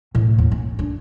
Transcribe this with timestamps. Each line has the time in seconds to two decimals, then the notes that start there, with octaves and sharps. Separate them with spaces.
0.15 A2
0.38 D#2
0.52 C#4
0.79 D4